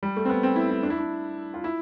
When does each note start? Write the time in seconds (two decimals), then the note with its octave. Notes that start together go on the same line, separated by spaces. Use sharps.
0.03 G3
0.17 A3
0.25 C4
0.29 B3
0.43 C4
0.56 E4
0.70 E4
0.83 D4
0.90 E4
0.98 D4
1.54 F4
1.64 E4